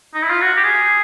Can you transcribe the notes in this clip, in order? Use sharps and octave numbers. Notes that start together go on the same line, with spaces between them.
D#4
E4
F4
F#4
G4
G#4